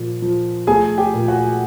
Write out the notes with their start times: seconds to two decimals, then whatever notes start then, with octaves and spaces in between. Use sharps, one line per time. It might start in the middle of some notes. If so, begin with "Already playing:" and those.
Already playing: A#2 F3
0.22 F3
0.67 A3 G#4 G#5
0.98 G4 G5
1.14 A#2
1.28 F#4 F#5